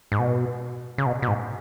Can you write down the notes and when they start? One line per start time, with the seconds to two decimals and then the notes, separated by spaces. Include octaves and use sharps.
0.12 G#2
0.19 B2
0.98 C#3
1.06 B2
1.22 B2
1.28 G#2